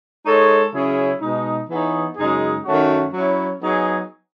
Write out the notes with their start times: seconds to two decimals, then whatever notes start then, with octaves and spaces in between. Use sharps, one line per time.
0.26 G#3 D#4 A4 C#5
0.72 C#3 F#3 C#4 E4 G#4
1.21 B2 G#3 D#4
1.69 E3 B3 D#4 G#4 C#5
2.16 F#2 C#3 G#3 D#4 G#4
2.65 F#2 D#3 A3 C#4 F#4
3.12 F#3 C#4 E4
3.60 F#3 B3 D#4 G#4